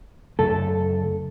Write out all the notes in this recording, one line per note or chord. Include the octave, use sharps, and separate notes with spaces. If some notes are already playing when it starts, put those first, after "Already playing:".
F#2 C#3 A3 A4